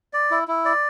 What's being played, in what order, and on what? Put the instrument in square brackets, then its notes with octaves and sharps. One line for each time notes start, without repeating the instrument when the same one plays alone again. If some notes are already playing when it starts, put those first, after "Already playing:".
[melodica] D5
E4
E4
D5